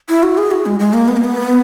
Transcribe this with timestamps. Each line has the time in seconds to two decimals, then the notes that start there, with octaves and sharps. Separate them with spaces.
0.09 E4
0.23 F#4
0.38 G#4
0.51 F#4
0.66 G#3
0.80 G#3
0.93 A#3
1.08 B3
1.17 A#3
1.24 B3